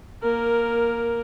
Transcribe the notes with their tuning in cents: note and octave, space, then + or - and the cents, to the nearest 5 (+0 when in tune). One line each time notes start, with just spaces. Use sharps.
A#3 +10 A#4 +0